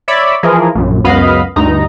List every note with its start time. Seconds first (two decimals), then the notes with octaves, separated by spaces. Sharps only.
0.08 C#5 D5 E5 B5
0.43 E3 F3 G#4 A#4
0.75 A#1 F#2
1.04 C#2 F#2 B3 D#5 F5 B5
1.56 D2 G2 D#4 A#5